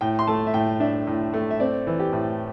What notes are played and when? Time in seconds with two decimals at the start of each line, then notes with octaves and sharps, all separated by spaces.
0.01 A2 G5
0.19 C6
0.27 A3 A5
0.47 E5
0.54 A2 G5
0.80 D4 E5
1.07 A2
1.34 A3
1.51 E5
1.60 C4 D5
1.87 E3
2.00 G4
2.13 A2